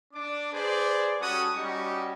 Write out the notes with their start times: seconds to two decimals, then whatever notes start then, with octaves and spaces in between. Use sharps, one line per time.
0.14 D4 D6
0.53 G#4 B4 C5 D5
1.20 G3 C#4 F#4 A4 F#5 D#6
1.54 G3 C#4 D#4 F#4 G4 C#6